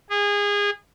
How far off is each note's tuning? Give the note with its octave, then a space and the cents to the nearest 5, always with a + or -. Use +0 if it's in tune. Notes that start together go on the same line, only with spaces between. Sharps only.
G#4 -25